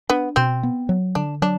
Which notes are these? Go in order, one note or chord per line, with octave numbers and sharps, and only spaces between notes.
B3 D4
B2 C4
B3
F#3
D3 D4
F#3 D4